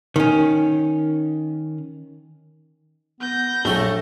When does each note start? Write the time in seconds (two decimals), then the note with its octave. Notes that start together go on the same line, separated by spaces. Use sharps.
0.16 D#3 C#4
3.21 B3 G6 A#6
3.65 A#1 F#3 A3 G7